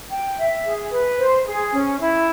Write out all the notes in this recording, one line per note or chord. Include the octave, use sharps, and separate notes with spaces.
G5
E5
G#4
B4
C5
G#4
C#4
E4